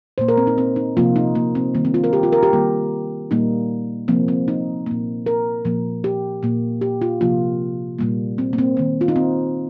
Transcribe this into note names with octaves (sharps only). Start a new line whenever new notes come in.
A#2 A#3 C5
A#4
C4
D#4
C4
D#4
C3 F3 A#3 F4
D#4
A#3
C4
D#3 G3 A#3
C4
F4
A#4
G4
F4
A#4
G4
D#3 G3 A#3
A#2 G3 A#3 D#4
C3 F3 A#3 C4
C4
D#4
A#2 A#3
A#4
A#2 F3 A#3
G4
A#2 A#3
G4
F4
C3 F3 A#3 F4
A#2 G3 A#3
C4
A#3
C4
D#3 A#3
F4
D#4
C4